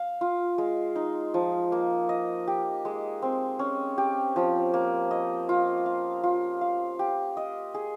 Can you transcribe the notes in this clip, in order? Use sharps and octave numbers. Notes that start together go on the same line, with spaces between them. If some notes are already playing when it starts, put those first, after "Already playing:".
Already playing: F5
F4
G#3
D#4
F3
A#3
D#5
G4
G#3
C4
C#4
G4
F3
A#3
D#5
F4
F5
F4
F5
G4
D#5
G#4